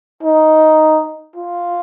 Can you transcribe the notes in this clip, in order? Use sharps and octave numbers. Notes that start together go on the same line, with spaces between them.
D#4
F4